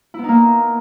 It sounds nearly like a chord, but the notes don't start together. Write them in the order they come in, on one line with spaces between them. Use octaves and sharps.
E4 B3 D#4 A#3